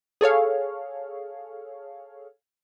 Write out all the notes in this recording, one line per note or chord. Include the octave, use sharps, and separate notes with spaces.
G#4 A4 C#5 F5